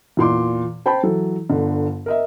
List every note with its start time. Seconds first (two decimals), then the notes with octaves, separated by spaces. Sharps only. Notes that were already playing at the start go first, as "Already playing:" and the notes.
0.17 E2 A#2 C6 D6
0.86 C5 G5 A5 B5
1.03 E3 F#3 A4
1.50 G1 D3
2.06 A#4 D#5 E5